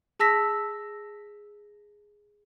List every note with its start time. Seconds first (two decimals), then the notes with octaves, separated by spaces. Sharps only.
0.20 G#4 A5 E6 A#6 B6